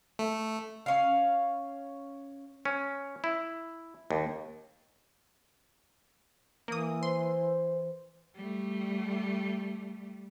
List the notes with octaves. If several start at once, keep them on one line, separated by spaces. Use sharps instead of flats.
A3
C#4 F5
C#4
E4
D#2
E3 A#3 D#6
C5 C6
G3 A3